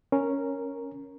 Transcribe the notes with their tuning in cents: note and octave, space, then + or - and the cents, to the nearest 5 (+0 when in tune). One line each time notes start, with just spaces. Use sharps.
C#4 +0 A#4 +0